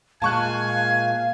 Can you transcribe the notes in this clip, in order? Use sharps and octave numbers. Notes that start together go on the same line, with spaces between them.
A#2 G#3 F5 G#5 A5 C#6 F#6